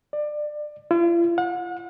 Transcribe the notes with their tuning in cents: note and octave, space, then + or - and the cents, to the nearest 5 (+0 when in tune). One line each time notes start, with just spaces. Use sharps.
D5 +25
F4 -45
F#5 -40